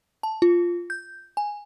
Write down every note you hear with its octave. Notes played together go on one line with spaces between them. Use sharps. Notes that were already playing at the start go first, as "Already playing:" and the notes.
A5
F4
G6
G#5